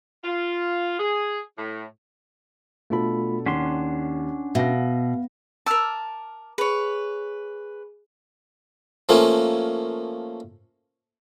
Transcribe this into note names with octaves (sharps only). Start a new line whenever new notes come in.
F4
G#4
A2
B2 A3 D4 F4 A4 B5
D#2 C#4 D4 F#5 C6
B2 E5 F5 A#6
A#4 A5 D6 E6 F6
G#4 B4 C#5
F3 A3 A#3 C#4